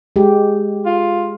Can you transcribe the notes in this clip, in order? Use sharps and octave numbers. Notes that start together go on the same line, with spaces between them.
G#3 G4
F4